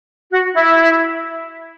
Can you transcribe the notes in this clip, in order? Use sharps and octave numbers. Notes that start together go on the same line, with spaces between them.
F#4
E4